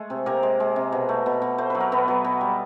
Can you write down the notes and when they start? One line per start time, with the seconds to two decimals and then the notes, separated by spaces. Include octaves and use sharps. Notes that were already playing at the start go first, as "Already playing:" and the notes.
Already playing: G#3 A3 A4
0.10 C3
0.26 C3 A#3 A#4
0.43 G#3
0.60 G#3
0.76 C3
0.92 B2
1.09 A3
1.26 B2
1.42 B2
1.58 A3 C5
1.70 F#3 B4
1.80 A#4
1.92 B2 B3 B4
2.08 F#3
2.24 B2
2.41 G3